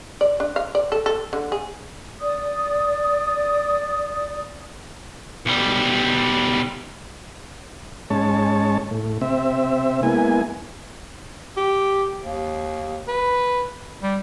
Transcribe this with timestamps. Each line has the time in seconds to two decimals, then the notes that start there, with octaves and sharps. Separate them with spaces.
0.21 D5
0.40 D4
0.56 F5
0.75 D5
0.92 A4
1.06 A4
1.33 D3
1.52 G#4
2.20 D5 D#6
5.46 B1 G3
8.10 G#2 G#3 C#4 C#5 A5
8.91 A2
9.21 C3 C4 E5
10.03 G#3 A#3 B3 E4 G#5
11.57 G4
12.21 D#2
13.08 B4
14.02 G3